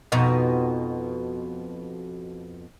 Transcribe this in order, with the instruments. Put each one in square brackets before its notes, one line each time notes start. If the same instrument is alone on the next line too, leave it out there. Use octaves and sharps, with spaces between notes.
[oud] F2 B2 D#4